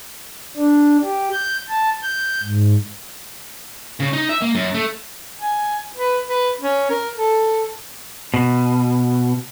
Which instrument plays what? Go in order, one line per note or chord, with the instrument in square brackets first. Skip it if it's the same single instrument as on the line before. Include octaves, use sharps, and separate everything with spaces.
[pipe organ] D4
G4
G6
A5
G6
G#2
[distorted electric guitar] C#3
D#4
E5
A#3
F#2
A3
[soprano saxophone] G#5
B4
B4
C#4
A#4
A4
[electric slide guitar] B2